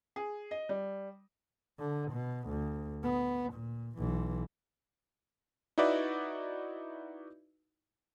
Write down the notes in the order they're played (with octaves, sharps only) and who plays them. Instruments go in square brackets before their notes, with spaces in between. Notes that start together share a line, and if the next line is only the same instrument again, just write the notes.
[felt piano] G#4
D#5
G3
[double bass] D3
B2
D2
B3
A#2
B1 E3
[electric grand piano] D#4 E4 F#4 B4 D5 E5